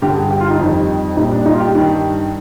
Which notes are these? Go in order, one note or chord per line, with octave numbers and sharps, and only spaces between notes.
G2 D3 G3 G4
G#4
G4
F4
D#4
F2 D#3 G3
A#2 G3 D#4
D4
D#4
F4
G4
G2 D#3 G3